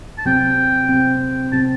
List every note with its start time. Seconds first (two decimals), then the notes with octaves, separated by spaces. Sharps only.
0.18 A5
0.25 C3 F#3 C4 G5
0.89 C3 F#3 C4
1.53 C3 F#3 C4 A5